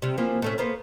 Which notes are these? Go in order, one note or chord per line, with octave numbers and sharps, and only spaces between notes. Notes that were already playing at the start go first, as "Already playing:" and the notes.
C3 G3
E3 F3 A#3
A2 A3 C#4
A#3 B3 C5